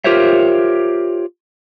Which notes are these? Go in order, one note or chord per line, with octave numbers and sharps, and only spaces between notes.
F4 G4 A#4 C5 C#5 E5